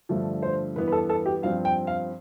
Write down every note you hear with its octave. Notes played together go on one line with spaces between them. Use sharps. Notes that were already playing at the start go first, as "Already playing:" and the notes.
G2 D3 F3 A3
C5
G2 E3 B3 B4
B4
A4
A4
G4
G2 F3 C4 F5
G5
F5